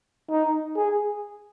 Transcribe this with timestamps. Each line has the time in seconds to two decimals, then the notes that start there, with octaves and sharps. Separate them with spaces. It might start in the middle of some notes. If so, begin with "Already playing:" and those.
0.30 D#4
0.76 G#4